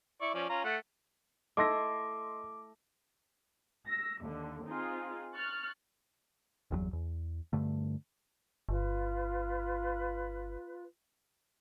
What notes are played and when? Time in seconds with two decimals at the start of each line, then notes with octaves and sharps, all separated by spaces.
0.21 E4 D5 C#6
0.34 F3 C#4 D5
0.49 C#4 F4 A#5
0.65 A3 F#5
1.57 A3 E4 A4 D#5 C6 D6 A#6
3.86 E6 A#6
4.23 D#2 D3
4.66 C4 D#4 F4 G#4
5.35 C#6 F6 F#6 A6
6.71 G1 E2 D3 F#3
6.93 E2
7.53 G2 D3 A3
8.69 G1 F4 B4